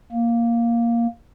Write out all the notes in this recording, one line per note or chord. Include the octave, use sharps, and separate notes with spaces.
A#3